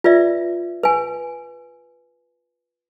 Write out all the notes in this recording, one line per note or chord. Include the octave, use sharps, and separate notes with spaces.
F4 B4 D5 E5
B4 G#5